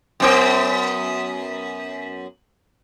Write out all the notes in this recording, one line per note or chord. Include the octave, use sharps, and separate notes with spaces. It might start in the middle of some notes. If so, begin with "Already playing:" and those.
F#2 B3 A#4